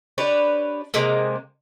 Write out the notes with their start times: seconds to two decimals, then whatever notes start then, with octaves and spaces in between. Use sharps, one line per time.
0.18 D4 G4 B4 C#5
0.94 C3 G#3 A#3